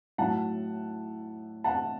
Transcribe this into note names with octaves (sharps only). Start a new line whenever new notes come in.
A2 F#3 A3 F#5 A5
F#5 A5